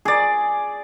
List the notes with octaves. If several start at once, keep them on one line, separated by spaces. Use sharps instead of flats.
G#4 D5